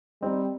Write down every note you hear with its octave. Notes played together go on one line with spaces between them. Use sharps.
G3 C4 D#4